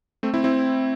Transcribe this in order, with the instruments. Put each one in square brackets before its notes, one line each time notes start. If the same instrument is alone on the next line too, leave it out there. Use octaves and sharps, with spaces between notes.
[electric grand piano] A3 C4
C4 E4
C4 E4